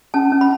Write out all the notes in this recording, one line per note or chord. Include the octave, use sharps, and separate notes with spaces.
C#4 A5
C#4
B5